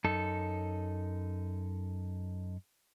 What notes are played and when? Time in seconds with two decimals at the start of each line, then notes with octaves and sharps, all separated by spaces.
0.04 F#2 D#4 A4